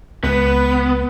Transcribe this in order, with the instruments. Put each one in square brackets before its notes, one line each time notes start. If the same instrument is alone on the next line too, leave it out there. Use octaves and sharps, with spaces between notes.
[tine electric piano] C#2 [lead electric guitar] B3 [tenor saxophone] B4